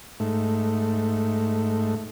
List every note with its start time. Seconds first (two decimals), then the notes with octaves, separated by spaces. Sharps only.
0.20 G#2 A3